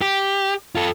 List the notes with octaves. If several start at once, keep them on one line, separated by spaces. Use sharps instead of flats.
G4
F4 A4